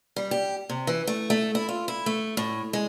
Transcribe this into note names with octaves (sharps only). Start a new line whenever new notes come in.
G3
G4
C3
E3
A3
A3
E4
F4
E4
A3
A2
G#3